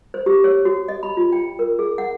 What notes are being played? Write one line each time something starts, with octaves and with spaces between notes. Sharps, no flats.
C5
G4
C#5
F#4
D#5
B5
F4
G5
A#4
G#4
F#5